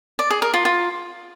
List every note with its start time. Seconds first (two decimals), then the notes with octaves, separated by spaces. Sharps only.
0.19 D5
0.30 G#4
0.42 A#4
0.54 F4
0.65 F4